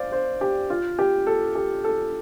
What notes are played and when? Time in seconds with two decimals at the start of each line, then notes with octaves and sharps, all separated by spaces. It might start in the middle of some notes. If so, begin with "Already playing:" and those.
Already playing: C5 D5 F5
0.12 C5
0.41 G4
0.70 F4
0.99 G4
1.27 A4
1.55 G4
1.84 A4